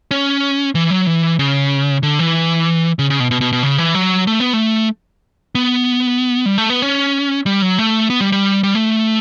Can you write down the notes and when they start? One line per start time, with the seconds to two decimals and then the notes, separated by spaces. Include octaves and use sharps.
0.11 C#4
0.75 E3
0.91 F#3
1.07 E3
1.39 C#3
2.03 D3
2.19 E3
2.99 C#3
3.10 C#3
3.20 B2
3.31 B2
3.41 B2
3.52 B2
3.63 C#3
3.78 E3
3.95 F#3
4.27 A3
4.40 B3
4.53 A3
5.55 B3
6.46 G3
6.58 A3
6.70 B3
6.82 C#4
7.46 G3
7.62 F#3
7.78 A3
8.10 B3
8.21 G3
8.32 G3
8.63 G3
8.75 A3